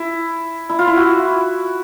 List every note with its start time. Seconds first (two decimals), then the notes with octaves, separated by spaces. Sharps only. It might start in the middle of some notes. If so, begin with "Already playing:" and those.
Already playing: E4
0.69 E4
0.79 F4
0.87 E4
0.96 F#4